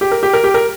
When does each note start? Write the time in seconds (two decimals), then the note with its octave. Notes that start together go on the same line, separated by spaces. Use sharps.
0.01 G4
0.12 A#4
0.23 G4
0.33 A#4
0.44 G4
0.54 A#4